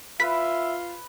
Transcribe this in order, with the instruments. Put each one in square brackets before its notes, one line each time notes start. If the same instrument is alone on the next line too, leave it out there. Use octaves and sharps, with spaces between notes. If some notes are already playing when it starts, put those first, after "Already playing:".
[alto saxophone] F4 [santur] B4 [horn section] E5 [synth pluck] B6